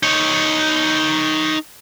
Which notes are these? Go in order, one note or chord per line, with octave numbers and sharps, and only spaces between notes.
D#4 C#5